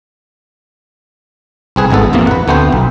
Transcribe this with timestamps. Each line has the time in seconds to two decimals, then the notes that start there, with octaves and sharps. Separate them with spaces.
1.76 C2 C4 G#4 B4
1.91 G#1 G#2 B3 A4 A5
2.13 A#1 F2 C3 E3 A#3
2.27 B4 F#5
2.48 D2 A3 B3 C4 C5
2.72 B1